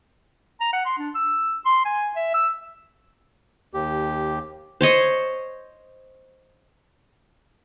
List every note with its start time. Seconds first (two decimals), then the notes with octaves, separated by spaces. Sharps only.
0.61 A#5
0.73 F#5
0.86 C6
0.99 D4
1.15 E6
1.66 C6
1.85 G#5
2.16 E5
2.34 E6
3.74 D#2 G4
4.81 C5 C#5 D#5